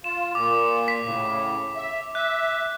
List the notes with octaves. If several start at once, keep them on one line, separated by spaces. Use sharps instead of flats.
F4 E7
A#2 D6
B6
A2 C#3
E5
E5 F#6